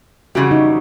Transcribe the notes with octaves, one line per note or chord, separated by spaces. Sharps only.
F2 C#3 E3 G3 F#4
D#4